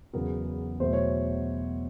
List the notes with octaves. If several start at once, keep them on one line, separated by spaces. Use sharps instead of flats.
E2 C#3 F#3 B3 A#4
E2 B2 F#3 A3 C5
C#5